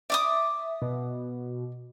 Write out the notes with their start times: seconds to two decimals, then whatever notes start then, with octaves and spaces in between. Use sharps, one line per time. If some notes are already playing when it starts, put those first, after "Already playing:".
0.10 D5 E5 D6 D#6
0.82 B2